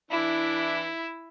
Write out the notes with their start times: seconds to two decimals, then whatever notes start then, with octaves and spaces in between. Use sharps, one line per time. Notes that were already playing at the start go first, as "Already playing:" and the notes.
0.11 E3 D4 E4